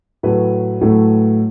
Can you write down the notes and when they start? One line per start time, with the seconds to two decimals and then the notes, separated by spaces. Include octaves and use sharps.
0.23 A2 F#3 A3 B4
0.81 A2 F#3 A3